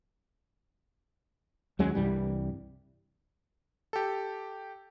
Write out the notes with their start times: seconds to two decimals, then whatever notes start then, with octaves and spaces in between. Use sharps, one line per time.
1.79 D#2 F#3 G#3 C#4
1.95 C2 G2 E3 G3
3.93 G4 A4